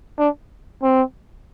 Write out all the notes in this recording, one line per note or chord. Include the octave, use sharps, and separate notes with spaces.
D4
C4